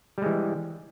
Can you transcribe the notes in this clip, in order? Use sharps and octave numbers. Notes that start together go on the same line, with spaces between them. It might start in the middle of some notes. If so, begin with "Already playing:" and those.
E3 G3 G#3